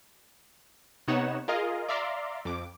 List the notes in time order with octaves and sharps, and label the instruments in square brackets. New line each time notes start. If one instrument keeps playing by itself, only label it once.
[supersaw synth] C3 B3 D#4 C#5 F#5 E7
F4 G#4 A#4 D#5 F5
D5 E5 F5 A#5 C6 D6
F2 D6